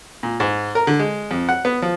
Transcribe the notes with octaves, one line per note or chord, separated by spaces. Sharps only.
A#2
G#2
A#4
D3
G#3
F2
F#5
B3
F3